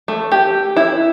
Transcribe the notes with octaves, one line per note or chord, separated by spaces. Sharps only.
A3
G4
E4